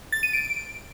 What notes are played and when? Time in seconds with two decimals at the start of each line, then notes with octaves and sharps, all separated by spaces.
0.12 A6
0.23 D#7
0.33 D7